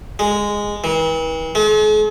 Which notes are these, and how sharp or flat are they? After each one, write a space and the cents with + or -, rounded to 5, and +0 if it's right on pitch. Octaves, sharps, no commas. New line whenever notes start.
G#3 -10
E3 -40
G#3 +45